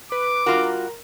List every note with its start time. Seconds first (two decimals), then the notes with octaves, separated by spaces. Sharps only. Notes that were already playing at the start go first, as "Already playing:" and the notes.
0.12 B4 D6
0.46 G3 F4 F#4 A#4